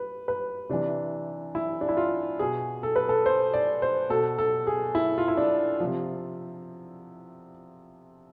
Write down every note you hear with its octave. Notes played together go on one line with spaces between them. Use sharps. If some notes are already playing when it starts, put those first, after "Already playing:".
Already playing: B4
B4
C3 E3 D4
E4
D4
E4
F4
B2 G#4
A4
B4
A4
C5
D5
C5
B2 A4
A4
G#4
E4
F4
E4
D4
C3 F3